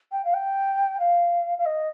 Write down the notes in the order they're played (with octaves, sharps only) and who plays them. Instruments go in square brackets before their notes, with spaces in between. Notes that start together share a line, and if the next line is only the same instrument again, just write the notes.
[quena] G5
F5
G5
F5
F5
D#5